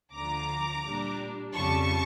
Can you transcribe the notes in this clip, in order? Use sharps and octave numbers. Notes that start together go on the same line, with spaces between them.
D2 D3 F3 A#5 D6
A#2 G3 D4
F2 C#3 G3 A5 C#6